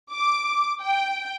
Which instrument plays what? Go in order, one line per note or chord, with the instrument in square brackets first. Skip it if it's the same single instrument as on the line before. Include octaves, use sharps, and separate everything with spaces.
[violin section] D6
G5